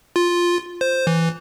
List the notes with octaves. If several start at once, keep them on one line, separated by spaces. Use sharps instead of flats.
F4
C5
E3